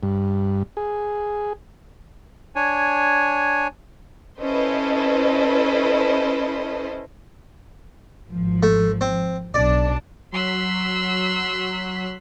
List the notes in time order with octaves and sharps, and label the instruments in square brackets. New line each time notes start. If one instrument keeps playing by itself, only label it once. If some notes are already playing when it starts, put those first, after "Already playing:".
[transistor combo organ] G2
G#4
[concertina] D4 C#5 G#5
[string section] C#4 E4 A4 B4 C5 D#5
G#1 F3
[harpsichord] A3
C4
[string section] B1 D4 [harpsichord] D5
[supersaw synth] F#3 B6 [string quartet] C6 E6 F#6